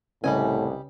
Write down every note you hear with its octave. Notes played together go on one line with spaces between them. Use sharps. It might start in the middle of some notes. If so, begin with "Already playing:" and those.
C2 A2 C#3 G3 C#4 B4 D#5 G#5